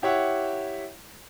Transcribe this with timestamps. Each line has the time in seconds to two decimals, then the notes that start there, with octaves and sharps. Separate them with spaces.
0.02 E4 G4 C#5 E5 F#5